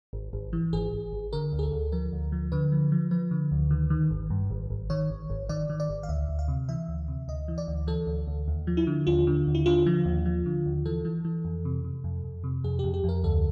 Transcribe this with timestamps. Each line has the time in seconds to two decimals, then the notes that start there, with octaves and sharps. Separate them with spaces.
0.13 G#1
0.33 G#1
0.53 E3
0.73 G#1 G#4
0.93 G#1
1.13 G#1
1.33 D3 A#4
1.53 D2
1.59 G#4
1.63 A4
1.72 D2
1.92 F3 A#4
2.12 D2
2.32 F3
2.52 D3 B4
2.72 F3
2.92 F3
3.11 F3 B4
3.31 D3
3.51 D2
3.71 D#3
3.90 D#3
4.11 G#1
4.30 G2
4.50 G#1
4.70 G#1
4.90 D#3 C#5
5.10 G#1
5.30 G#1
5.49 D#3 D5
5.69 D#3
5.80 D5
5.89 G#1
6.03 F5
6.09 D2 E5
6.29 D2
6.39 F5
6.48 C3
6.69 E3 E5
6.89 D2
7.08 C3
7.28 D2 D#5
7.48 E3
7.58 D5
7.68 D2
7.87 E3 A4
8.07 D2
8.27 D2
8.48 D#2
8.67 F3
8.77 E4
8.87 D3
9.07 D#2 F4
9.27 D3
9.47 D#2
9.55 E4
9.66 D3 F4
9.86 F3
10.05 D#2
10.26 F3
10.46 D3
10.66 D#2
10.85 E3 A4
11.05 E3
11.25 E3
11.45 F2
11.65 C3
11.84 C3
12.04 F2
12.24 F2
12.44 C3
12.64 F2 G#4
12.79 G4
12.84 F2
12.94 G4
13.04 F2 A#4
13.24 D2 A4